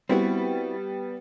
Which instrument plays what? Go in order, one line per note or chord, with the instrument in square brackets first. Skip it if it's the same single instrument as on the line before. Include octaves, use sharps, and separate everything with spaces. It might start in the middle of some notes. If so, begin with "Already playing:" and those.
[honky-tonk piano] G3 B3 [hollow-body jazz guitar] C4 E4 F#4